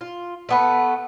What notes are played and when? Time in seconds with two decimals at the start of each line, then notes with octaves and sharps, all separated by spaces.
0.01 F4
0.49 A3 B3 B4